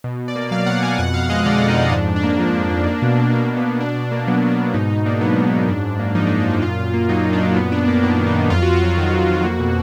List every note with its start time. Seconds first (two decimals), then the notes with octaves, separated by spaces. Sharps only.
0.04 B2
0.20 B2
0.28 D5
0.36 A#3
0.51 F#3 F5
0.66 B2 F#5
0.83 B2 G#5
0.99 F2 F#5
1.14 F2 F5
1.30 G#3 D#5
1.40 D#5
1.46 D3 D5
1.61 F2
1.68 D#4
1.77 F2
1.92 G#2 D4
2.08 G#2
2.16 D4
2.23 A#3
2.39 F3
2.55 G#2
2.71 G#2
2.86 A#3
3.02 B2
3.18 B2
3.33 A#3 D4
3.49 A#3
3.57 B3
3.65 B2
3.81 B2 D4
3.96 B2
4.12 A#3
4.27 F#3 B3
4.43 B2
4.51 D4
4.59 B2
4.74 G#2 D#4
4.90 G#2 D#4
5.06 A#3 D4
5.21 F#3 B3
5.37 G#2 D4
5.52 G#2 B3
5.68 F#2 D4
5.84 F#2
5.99 A#3
6.15 F3 D#4
6.27 D4
6.31 F#2
6.39 D4
6.47 F#2 D#4
6.62 A#2 F4
6.78 A#2
6.94 A#3
7.09 F#3 D#4
7.25 A#2
7.33 D4
7.41 A#2
7.56 F#2 B3
7.72 F#2 D4
7.87 A#3 D4
8.03 D#3 D4
8.19 F#2
8.27 D#4
8.35 F#2
8.50 F2 F4
8.62 F2 F#4
8.74 F4
8.82 F#3 F#4
8.97 D#3 F#4
9.12 F2
9.29 F2
9.44 A#3
9.60 B2